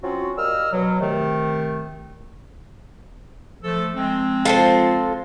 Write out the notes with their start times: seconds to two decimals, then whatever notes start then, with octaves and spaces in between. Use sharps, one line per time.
0.03 F#3 C4 C#4 F4 F#4
0.37 G3 A#3 A#4 D#5 E6 F6
0.72 B2 F#3
1.00 C3 D#3 A3
3.63 F3 A3 A4
3.95 F3 G#3 C4
4.45 F4 A4 C5